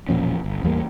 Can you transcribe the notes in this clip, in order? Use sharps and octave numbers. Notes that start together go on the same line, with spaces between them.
E1 A#2 F3 C#4
G1
A1 E2 G3 A#3